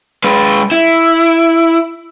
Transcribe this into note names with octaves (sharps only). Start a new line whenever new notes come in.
G#3 B4
E4